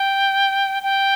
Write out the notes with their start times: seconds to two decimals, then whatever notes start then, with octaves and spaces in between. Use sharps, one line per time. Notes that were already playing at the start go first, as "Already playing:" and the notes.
Already playing: G5
0.83 G5